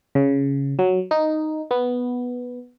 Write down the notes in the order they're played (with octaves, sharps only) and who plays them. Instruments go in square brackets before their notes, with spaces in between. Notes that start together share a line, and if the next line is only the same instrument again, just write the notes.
[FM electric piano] C#3
F#3
D#4
B3